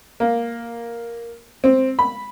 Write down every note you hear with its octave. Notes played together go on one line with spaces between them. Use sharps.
A#3
C4
B5